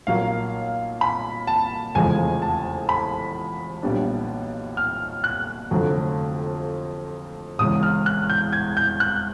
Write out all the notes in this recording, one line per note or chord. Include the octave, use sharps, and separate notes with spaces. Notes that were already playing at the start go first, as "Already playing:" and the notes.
B1 A#2 F#3 A#3 F5
B5
A5
F1 E2 C#3 F3 G#3 G#5
A5
B5
B1 A#2 G3 B3 D4
F6
F#6
F1 F2 D3 F#3
E1 E2 C#3 D#6
F6
F#6
G6
G#6
G6
F#6